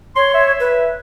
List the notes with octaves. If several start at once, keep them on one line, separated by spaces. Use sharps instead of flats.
C#5 C6
E5
B4